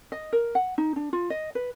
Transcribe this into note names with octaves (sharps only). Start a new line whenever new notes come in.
D#5
A#4
F#5
D#4
D4
F4
D#5
B4